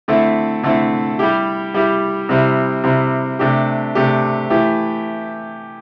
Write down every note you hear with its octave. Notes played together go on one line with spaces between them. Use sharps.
D3 A3 C4 E4
D3 A3 C4 E4
G3 E4 G4
G3 E4 G4
C3 G3 C4 E4
C3 G3 C4 E4
C3 A3 D4 G4
C3 A3 D4 G4
E3 A3 E4 G4